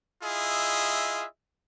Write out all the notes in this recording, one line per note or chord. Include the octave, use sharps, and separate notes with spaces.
E4 F4 G#4 D#5 E5